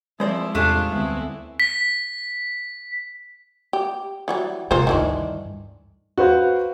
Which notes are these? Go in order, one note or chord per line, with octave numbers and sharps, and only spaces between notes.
F3 G#3 C4 E4 C5 D5
E2 A2 C3 G3 A3 D4 F4 G#4
D2 G3 B3 C4 E4
B6
G4
E3 F#3 G3
A2 C3 F4 A#4 C5
D2 G2 D#3 E3 D4
F#4 B4 C5 F5